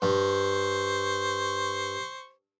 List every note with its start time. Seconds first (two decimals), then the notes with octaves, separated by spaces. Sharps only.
0.02 G2 C5 C#6